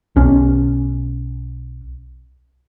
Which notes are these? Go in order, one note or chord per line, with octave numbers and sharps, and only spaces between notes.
B1 C#4